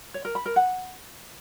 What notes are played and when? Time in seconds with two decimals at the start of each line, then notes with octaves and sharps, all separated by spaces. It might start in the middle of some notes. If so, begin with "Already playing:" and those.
0.14 C#5
0.25 A#4
0.35 B5
0.46 A#4
0.56 F#5